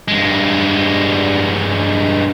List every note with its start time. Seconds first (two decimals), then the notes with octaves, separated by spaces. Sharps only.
0.08 G2 G#3